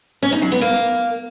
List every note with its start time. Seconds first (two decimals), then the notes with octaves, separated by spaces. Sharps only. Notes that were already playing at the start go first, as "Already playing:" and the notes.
0.23 C#4
0.32 D#4
0.42 F#3
0.52 B3
0.61 A#3